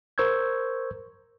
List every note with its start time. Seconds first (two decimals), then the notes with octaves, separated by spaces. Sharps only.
0.18 A#4 C5 C#6 E6 G6 G#6